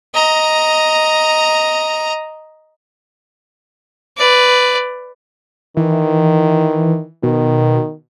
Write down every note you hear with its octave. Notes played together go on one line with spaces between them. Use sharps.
D#5 A#5
B4 D5
D#3 E3
B2 D#3